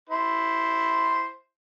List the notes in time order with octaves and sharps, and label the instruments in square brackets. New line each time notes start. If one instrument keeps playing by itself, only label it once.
[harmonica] E4 C5